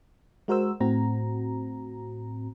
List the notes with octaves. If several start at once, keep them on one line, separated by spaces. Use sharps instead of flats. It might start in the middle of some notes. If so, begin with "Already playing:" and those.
G#3 F#4 A#4 C5 E6
A2 C4 F#4 A#5